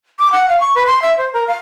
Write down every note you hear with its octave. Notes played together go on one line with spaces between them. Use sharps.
D6
F#5
F5
C#6
B4
C6
E5
C5
A#4
F5